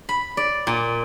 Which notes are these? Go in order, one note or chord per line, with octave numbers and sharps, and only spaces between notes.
B5
D5
A#2